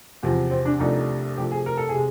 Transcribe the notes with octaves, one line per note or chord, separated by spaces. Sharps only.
E2 C3 F3
C4
D4
C2 C3 F3 A3 D4 D#4
C3 F3 A3 G4
G#4
A#4
A4
G#4
C3 G#3